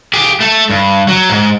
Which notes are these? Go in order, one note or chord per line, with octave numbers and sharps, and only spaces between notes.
G4 G#4
A3 A4
G2
F#3
G#2